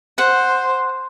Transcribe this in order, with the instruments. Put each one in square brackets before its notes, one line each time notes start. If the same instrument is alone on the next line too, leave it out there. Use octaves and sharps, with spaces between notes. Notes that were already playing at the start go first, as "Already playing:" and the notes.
[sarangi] C5 [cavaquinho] F#5